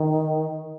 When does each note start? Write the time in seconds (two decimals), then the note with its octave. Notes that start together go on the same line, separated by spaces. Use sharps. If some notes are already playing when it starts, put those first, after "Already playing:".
Already playing: D#3